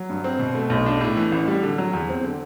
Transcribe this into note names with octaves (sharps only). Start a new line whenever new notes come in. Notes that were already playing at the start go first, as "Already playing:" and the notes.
Already playing: F#3
G2
C4
B2
A3
B1
D4
A2
E3
A1
G3
D3
F#3
E2
C4
D3